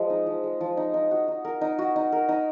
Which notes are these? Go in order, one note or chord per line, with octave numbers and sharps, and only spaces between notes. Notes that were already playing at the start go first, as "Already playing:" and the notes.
Already playing: F3 G#3
D#4
F3
G#3
F3
D#4
D#4
F#4
D#4
A#4
D#4
F#4
D#4
A#4
D#4